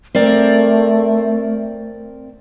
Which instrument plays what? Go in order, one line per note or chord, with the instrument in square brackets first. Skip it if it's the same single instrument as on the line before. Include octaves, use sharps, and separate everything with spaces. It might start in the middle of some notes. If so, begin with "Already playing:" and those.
[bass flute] A3 [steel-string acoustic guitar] C4 A#4 D5